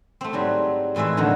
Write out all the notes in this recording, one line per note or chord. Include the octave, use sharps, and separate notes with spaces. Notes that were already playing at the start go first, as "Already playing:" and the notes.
A3 C4
G#2 F#3 G3
F2 A2 E3 G#3 E5
F2 B2 D3 D#3 F#3